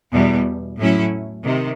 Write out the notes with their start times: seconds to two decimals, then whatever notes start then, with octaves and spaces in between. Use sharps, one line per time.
0.13 E2 B2 G3
0.78 A2 F#3 A3 C#4 E4
1.45 C3 D#3